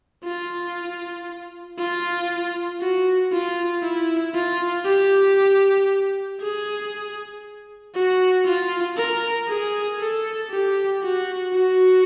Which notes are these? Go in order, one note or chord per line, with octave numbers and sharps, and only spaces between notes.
F4
F4
F#4
F4
E4
F4
G4
G#4
F#4
F4
A#4
G#4
A4
G4
F#4
F#4